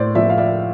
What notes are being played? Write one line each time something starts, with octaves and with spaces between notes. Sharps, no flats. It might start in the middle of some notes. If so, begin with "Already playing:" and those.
Already playing: A2 C5 D5
F3 D5 E5
F5
D5 E5